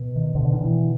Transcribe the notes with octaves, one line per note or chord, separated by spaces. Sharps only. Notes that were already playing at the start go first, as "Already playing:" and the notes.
Already playing: B2
D#3
B2 D3
D#3
E3